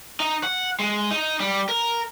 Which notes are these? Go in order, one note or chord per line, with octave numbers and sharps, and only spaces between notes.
D#4
F#5
G#3
D#4
G3
A#4